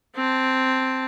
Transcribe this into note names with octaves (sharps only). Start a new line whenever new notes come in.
C4 A5